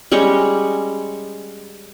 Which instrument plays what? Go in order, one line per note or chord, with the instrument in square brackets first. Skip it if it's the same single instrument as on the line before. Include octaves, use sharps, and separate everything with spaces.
[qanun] G3 G#3 C#4 C#5